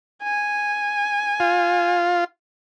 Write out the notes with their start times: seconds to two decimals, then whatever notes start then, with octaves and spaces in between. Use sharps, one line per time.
0.23 G#5
1.40 F4